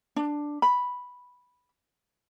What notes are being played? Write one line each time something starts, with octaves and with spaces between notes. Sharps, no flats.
D4
B5